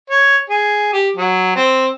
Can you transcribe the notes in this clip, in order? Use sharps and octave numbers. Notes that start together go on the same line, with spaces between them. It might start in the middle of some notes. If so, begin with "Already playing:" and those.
C#5
G#4
G4
F#3
C4